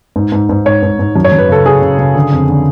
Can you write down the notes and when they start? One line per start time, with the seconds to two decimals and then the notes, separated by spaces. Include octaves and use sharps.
0.16 G#2
0.32 G#2
0.49 G#2
0.66 G#2 C#5
0.83 G#2
0.99 G#2
1.16 F#2
1.24 C#5
1.32 F#2
1.38 B4
1.49 C#3 A4
1.66 C#3 G#4
1.82 C#3
1.99 C#3
2.15 D3
2.32 F2
2.49 D3